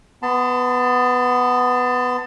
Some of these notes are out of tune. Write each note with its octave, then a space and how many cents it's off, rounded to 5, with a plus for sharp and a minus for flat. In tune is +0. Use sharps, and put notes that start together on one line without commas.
B3 +10 A5 +20 C6 -40